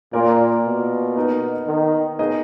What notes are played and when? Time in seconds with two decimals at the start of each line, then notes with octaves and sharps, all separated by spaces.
0.13 A#2 A#3 F4 A#4 D5
0.65 B2
1.16 B3 D#4 A#4 D#5
1.67 D#3
2.19 B3 D#4 G#4 D#5